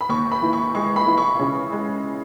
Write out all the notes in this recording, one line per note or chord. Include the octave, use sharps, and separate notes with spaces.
B5
D#2 C#6
B5
E3
C#6
G#3 C#6
B5
E3
C#6
C#3
G#3